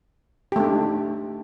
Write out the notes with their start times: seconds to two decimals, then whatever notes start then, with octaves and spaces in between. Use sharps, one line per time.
0.52 G4
0.56 A3
0.60 D4
0.64 D#4